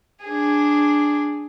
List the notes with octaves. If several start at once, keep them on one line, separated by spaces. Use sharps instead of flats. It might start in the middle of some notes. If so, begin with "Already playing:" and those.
D4 G#4